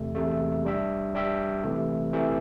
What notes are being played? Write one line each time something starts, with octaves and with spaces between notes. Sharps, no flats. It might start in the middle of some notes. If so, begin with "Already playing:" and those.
Already playing: E2 C3 A3
E2 C3 A3
G3 D4 G4 E5
G3 D4 G4 E5
C3 E3 A3
C3 E3 A3